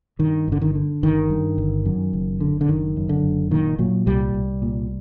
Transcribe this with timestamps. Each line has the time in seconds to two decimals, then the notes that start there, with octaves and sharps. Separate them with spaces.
0.19 G2 D#3
0.48 G1 D3
0.62 D#3
0.75 D3
1.03 G1 D#3
1.30 G2
1.58 G1
1.85 F#2
2.13 F#1
2.40 D3
2.61 D3
2.69 F#1 D#3
2.96 F#2
3.09 D3
3.23 F#1
3.51 A#2 D#3
3.78 A#2 F#3
4.06 C2 G3
4.34 C2
4.62 A#2